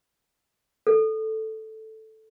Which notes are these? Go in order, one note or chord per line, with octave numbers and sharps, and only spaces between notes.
A4